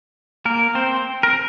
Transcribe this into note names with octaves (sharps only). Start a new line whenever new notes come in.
A#3 A#4
C4 C5
A#4